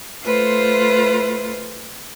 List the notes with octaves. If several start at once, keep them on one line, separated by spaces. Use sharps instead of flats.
A3 F4 B4 C5